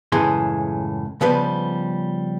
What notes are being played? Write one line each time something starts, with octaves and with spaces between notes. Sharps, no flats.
C#2 F#2 A2 E3 G#4 C6
C#3 F3 G3 B3 B4